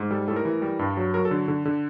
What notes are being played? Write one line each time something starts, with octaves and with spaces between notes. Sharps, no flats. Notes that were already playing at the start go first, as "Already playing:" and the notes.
Already playing: G#2
G3 A4
A2 A4
A#4
E3
G3
G2
F#3
F#3 A#4
A4
D3
D3
D3